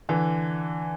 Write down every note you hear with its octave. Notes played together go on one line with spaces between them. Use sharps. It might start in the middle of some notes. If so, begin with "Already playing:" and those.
D3 E3